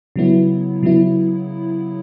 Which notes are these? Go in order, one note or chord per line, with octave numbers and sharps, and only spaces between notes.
C#3 F#3 B3 E4
C#3 F#3 B3 E4